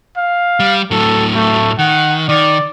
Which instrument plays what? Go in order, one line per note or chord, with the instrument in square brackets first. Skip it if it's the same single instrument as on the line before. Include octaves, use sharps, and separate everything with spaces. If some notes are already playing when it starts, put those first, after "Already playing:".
[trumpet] F5
[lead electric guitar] G3
[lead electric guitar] A2 F#3 [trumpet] A4
[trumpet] A3
[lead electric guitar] D#3 [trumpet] F#5
[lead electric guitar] D#3 [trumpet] D5